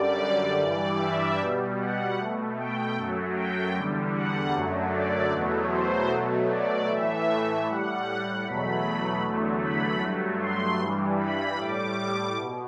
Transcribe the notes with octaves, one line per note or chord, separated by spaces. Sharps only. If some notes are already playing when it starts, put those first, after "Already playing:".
Already playing: F#2 D3 G3 D5
G2 E3 G3 D5
E5
B2 G3
F#5
B2 A3
G5
F#2 F#3 A3
G5
E2 D3 G3
F#5
F#2 D3 F#3 A3
D5
E2 B2 F#3 A3
C5
B2 F#3 A3
D5
A2 E3 A3 E5
A2 G3 F#5
E2 B2 F#3 A3 B5
E2 D3 F#3 A3
B5
G2 F#3 A3
C6
G2 E3 G3
B5
A2 G3 D6
B2